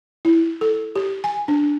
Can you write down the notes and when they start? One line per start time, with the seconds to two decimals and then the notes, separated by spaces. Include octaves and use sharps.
0.25 E4
0.61 A4
0.96 G4
1.24 G#5
1.48 D4